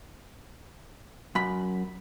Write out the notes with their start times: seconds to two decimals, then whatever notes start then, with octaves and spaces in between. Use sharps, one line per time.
1.35 F#2 B5